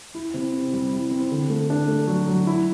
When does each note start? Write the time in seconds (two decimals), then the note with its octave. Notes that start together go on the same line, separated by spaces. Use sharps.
0.14 E4
0.34 C3
0.53 C4
0.73 G3
0.93 E4
1.11 C4
1.31 D3
1.50 A3
1.70 D4
1.88 A3
2.08 F#3
2.28 F#3
2.47 E4